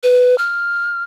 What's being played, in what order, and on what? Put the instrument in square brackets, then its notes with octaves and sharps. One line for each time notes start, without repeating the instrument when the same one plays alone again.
[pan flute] B4
F6